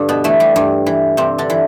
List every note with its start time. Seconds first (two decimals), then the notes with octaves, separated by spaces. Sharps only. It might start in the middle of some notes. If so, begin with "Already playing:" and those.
Already playing: G2 D3 D4
0.09 B2 B3
0.24 E3 A3
0.40 G3
0.56 G2 G3
0.86 E3
1.17 G2 C3 C4
1.38 D3 D4
1.50 E3